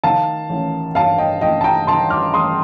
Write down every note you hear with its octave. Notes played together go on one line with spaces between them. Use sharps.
D#3 F5 A5
A1
G2 F5 A5
D#5 G5
A1 D#5 G5
A5
G5 A#5
D#3 A5 C6
D6 F6
A1 C6 D#6